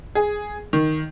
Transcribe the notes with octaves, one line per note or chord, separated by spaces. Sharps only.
G#4
D#3